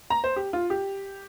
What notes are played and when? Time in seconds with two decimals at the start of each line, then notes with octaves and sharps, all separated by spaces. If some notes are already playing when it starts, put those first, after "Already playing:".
0.10 A#5
0.24 C5
0.36 G4
0.53 F4
0.70 G4